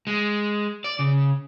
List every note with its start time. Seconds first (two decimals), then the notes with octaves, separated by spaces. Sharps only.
0.07 G#3
0.84 D5
0.99 C#3